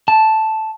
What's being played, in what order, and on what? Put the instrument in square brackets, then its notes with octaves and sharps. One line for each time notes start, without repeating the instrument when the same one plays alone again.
[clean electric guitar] A5